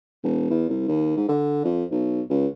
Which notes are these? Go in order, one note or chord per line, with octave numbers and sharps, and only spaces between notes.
E1
E2
C2
D#2
G#2
D3
F2
B1
C#2